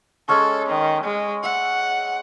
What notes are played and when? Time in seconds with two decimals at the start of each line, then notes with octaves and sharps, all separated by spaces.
0.29 G#3 C#4 A4 C#6
0.68 D#3
1.04 G#3
1.44 E5 F#5